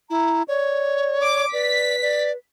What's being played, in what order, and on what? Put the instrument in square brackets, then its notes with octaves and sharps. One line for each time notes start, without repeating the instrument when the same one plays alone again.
[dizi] E4 [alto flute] A#5
[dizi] C#5 [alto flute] D5
[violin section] D6
[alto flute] B4 [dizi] D5 [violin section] B6
[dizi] D5